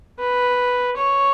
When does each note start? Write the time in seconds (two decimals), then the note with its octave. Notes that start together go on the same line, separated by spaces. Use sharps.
0.19 B4
0.97 C#5